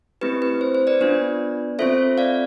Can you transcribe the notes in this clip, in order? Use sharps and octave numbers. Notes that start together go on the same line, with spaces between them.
A3 C4 E4 G4 B4
B4
C5
C5
B4 D5
B3 D4 F4
C4 F4 A4 C5 E5
D5 F5